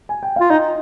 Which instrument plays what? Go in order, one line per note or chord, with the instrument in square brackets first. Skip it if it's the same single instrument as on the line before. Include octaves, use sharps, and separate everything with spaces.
[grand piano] G#5
G5
[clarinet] F4 [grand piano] F5
[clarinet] D#4 [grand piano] D#5